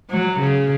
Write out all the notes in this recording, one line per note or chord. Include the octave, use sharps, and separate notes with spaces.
F#3
C#3